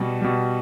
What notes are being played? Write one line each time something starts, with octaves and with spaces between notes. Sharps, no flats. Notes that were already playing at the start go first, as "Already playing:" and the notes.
Already playing: B2 G3
B2 G3